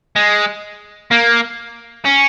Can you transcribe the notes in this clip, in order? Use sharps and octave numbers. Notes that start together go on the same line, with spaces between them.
G#3
A#3
C#4